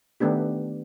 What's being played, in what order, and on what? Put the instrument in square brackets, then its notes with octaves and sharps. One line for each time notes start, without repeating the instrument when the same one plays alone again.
[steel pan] D#3 A3 B3 D4 G4